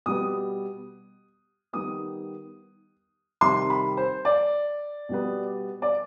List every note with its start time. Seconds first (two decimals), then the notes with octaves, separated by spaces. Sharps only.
0.06 B2 G3 B3 D#6
1.73 D#3 G3 B3 D#6
3.41 C3 D#3 G3 C4 C6
3.70 B5
3.97 C5
4.25 D5
5.09 B2 G3 B3
5.82 D5